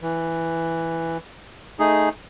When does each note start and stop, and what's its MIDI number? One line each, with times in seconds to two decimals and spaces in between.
0.01 1.18 52
1.79 2.09 57
1.79 2.09 63
1.79 2.09 68